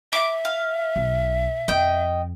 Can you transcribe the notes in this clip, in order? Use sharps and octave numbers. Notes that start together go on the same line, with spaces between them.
E5 D6
F5
B1
F2 D#5 G5